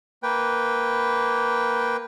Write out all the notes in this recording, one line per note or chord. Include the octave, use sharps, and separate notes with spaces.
A#3 B4 G5